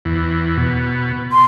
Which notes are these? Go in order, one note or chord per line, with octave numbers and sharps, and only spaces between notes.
E2
B2
C6